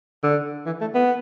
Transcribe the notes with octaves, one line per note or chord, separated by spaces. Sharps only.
D3
E3
A3
B3